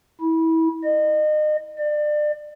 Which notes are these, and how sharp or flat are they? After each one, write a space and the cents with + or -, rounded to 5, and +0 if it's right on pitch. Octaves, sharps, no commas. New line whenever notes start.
E4 -25
D#5 -35
D5 +30